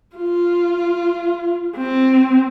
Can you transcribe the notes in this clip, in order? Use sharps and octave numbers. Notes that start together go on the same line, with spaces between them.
F4
C4